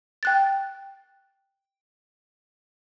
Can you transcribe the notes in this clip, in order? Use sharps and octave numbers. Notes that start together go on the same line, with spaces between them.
G5 F#6 A6